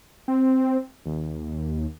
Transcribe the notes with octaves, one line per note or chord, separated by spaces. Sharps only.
C4
D#2